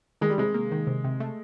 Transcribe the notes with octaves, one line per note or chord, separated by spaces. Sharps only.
D#3 G#3
G3
C3 G#3
A#3
D#3
C3
C3
A3